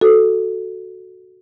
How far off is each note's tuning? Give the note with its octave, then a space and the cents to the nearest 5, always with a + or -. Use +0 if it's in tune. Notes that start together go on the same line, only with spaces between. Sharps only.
F#4 +0 A4 +0